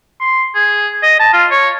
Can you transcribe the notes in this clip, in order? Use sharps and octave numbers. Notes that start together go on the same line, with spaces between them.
C6
G#4
D#5
A5
F4
C#5